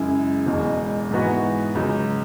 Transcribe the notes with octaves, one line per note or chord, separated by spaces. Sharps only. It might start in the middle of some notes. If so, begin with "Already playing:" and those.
Already playing: F#2 C#3 G#3 E4
E1 E2 B2 G#3
G#2 E3 B3 F#4
C#2 C#3 F#3